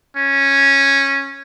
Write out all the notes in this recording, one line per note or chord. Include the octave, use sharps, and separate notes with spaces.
C#4